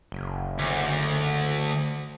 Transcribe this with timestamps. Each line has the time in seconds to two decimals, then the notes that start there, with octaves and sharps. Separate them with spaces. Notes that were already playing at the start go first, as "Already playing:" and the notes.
0.12 F#1
0.59 D2